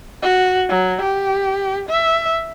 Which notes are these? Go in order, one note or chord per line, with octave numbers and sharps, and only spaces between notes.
F#4
F#3
G4
E5